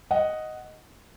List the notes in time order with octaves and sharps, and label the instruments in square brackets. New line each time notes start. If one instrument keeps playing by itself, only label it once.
[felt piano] D#5 F#5